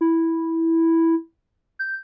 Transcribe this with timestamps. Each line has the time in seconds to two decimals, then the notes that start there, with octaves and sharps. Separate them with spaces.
0.01 E4
1.79 G6